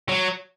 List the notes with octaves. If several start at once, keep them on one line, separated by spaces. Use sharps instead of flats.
F#3